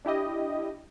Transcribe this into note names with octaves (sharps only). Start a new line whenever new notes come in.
D4 E4 G4 D#5